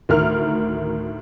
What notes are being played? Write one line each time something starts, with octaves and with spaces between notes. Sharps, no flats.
D2 A2 D#3 A#4 F6